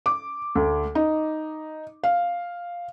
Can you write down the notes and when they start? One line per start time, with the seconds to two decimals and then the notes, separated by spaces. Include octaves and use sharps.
0.06 D6
0.55 D2
0.95 D#4
2.04 F5